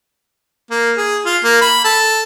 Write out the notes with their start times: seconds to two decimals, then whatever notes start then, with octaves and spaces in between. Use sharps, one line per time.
0.71 A#3
0.97 G#4
1.26 F4
1.44 A#3
1.61 B5
1.85 A4